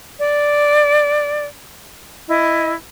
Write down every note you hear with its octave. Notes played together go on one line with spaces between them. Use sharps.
D5
E4 D#5